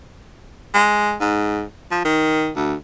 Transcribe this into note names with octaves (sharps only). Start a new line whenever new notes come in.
G#3
G#2
F3
D#3
D2